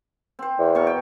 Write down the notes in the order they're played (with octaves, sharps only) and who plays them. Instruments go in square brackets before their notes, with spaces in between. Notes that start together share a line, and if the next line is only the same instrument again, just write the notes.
[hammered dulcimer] C4 C5
[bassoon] E2
[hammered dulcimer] B2 A#4 C#6
G5